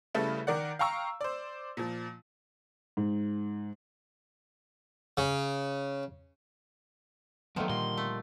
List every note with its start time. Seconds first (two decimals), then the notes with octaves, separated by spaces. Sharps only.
0.14 C#3 G3 A3 E4 A4 B4
0.47 D#3 A#4 D5 F#5
0.79 F5 G5 A#5 C#6 E6
1.21 C5 D5
1.77 A#2 F3
2.97 G#2
5.17 C#3
7.56 D3 D#3 F3 F#3 A3 B3
7.70 A#2 G3 A#3 C6
7.98 A3